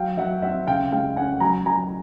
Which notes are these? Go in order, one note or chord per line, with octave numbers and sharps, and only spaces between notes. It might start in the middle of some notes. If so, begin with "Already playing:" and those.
Already playing: F#3 F5 G5
F#3 E5 F#5
C4 E5 F#5
C#3 F5 G5
G#3 F5 G5
C#4 F#5 G#5
F#3 G#5 A#5
F#3 G#5 A#5